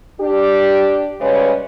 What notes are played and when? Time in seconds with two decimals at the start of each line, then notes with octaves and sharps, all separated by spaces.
0.21 D4 G4
1.21 C#3 G3 G#3 C#4 B4